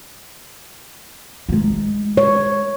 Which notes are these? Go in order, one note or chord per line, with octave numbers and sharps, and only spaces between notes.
G#3 D#4
C#5